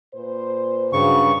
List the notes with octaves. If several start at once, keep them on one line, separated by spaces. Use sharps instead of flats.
A#2 B4 C5
G2 C#3 F#3 G3 F#4 C#6